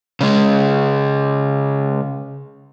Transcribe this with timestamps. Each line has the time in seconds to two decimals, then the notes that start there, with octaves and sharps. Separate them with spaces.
0.21 C#3 G#3